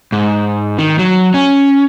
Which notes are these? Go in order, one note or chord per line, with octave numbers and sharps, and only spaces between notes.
G#2
D#3
F#3
C#4